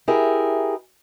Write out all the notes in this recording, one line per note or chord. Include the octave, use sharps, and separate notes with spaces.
E4 G4 G#4 A#4 E5